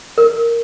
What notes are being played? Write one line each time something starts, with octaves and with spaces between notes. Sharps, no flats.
A#4